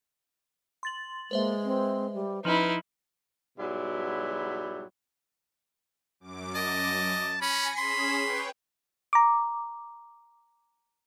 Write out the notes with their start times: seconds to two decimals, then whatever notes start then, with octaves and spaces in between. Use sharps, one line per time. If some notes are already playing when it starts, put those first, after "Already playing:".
0.83 C6 A6 F#7
1.31 G#3 A#3 B4 C5 E5
1.64 C4
2.13 G3
2.45 F3 C#4 D#4 E4 B4 F#7
3.58 G#2 B2 F#3 G3 E4
6.20 F#2 D6
6.55 D#5 A5
7.42 C#4 G#5 B5 A#6 C#7
7.77 C#4 G#4 B5 C6 E7
8.19 B4 C#5 G5
9.13 A#5 D6